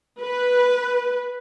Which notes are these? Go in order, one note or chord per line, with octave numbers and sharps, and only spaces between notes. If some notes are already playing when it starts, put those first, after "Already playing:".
B4